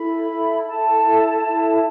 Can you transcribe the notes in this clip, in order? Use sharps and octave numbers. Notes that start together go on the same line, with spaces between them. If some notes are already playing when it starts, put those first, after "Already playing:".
Already playing: E4 A4 B5
E4 A4
E4 A4 A5
E4 A4
E4 A4